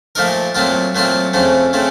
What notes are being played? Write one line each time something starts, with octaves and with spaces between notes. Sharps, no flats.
A#2 F3 A3 D#4 A#4
A#2 F#3 A3 C4 F4
A#2 F#3 A3 C4 F4
F2 C#3 A3 C4
C#3 A3 C4